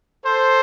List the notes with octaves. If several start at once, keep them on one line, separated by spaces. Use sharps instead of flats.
A4 C5